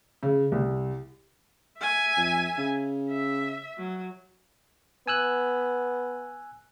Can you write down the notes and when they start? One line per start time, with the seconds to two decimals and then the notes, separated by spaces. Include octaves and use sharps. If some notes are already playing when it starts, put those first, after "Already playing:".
0.23 C#3
0.52 C2
1.80 E5 G#5
2.17 F2
2.58 C#3
3.10 E5
3.78 F#3
5.07 B3 G#5 E6 F#6